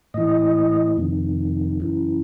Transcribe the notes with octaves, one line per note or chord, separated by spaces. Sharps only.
A2 E3 D#5
F2 C3 D#3
F#2 C#3 E3